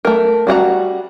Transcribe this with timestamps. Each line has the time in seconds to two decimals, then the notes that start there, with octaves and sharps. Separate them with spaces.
0.05 A3 A#4
0.47 G3 F#4 F#5 A#5